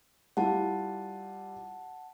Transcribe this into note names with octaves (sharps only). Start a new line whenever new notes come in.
G3 E4 F4 F#5 A5